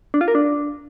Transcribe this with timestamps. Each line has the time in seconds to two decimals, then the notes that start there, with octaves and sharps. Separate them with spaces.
0.14 D4
0.21 F4
0.28 A#4
0.35 D4